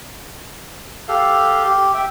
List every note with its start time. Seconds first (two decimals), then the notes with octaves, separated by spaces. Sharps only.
1.08 G4 A4 F5
1.64 G4
1.94 E5 G5